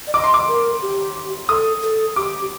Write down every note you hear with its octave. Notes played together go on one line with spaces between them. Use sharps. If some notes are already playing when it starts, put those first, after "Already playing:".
D5
D#5 D6
C6
D6
A#4
G4
A4 D#6
A4
G4 D6